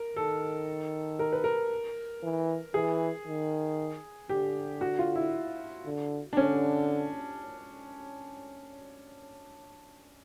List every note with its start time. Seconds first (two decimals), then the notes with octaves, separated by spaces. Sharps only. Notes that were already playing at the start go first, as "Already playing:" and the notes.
Already playing: A#4
0.16 D#3 A4
1.19 A#4
1.33 B4
1.44 A#4
2.23 E3
2.74 E3 G#4
3.27 D#3
4.29 D3 G4
4.81 F#4
4.99 F4
5.16 E4
5.85 D3
6.33 D4
6.37 D3 C#4